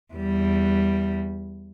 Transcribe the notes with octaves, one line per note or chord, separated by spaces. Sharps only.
E2 G3